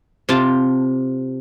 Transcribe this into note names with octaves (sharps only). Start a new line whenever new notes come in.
C3 F4 A5